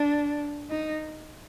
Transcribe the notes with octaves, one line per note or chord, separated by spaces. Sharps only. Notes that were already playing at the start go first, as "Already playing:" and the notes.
Already playing: D4
D#4